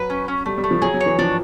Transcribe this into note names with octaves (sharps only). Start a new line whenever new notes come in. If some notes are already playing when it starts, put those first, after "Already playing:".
Already playing: F#3 B4
C#4
C#4
G3 A3
G3
A3
F3
F#3 G#4
F#3
C#5
E3
F3 D4